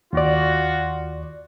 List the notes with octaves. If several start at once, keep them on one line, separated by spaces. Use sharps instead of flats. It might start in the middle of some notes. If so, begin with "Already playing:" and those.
D#2 F4 F#4 D5